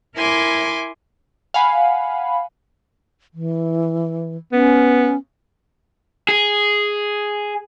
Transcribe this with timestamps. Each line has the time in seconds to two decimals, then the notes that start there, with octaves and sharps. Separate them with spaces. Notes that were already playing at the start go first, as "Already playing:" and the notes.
0.16 E4 A#4 G#5 C6 D6
1.54 F5 F#5 G#5 B5
3.34 E3
4.53 B3 C#4
6.29 G#4